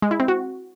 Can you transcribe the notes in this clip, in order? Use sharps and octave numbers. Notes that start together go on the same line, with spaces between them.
G#3
E4
C4
F#4